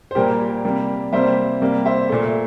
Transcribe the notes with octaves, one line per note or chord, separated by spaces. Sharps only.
C5
A#2 G3 A#3 G4 A#4
C3 G3 A#3
C3 G3 A#3 C5 E5
C3 G3 A#3
C5 E5
A#2 A3